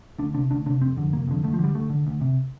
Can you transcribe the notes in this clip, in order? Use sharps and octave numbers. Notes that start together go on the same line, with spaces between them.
D2 D4
C3 D4
D2 D4
C3 D4
F1 C4
F2 D3
F1 A#3
F2 D3
D2 A3
F3
D3 G3
D2 A3
D3
D2
C3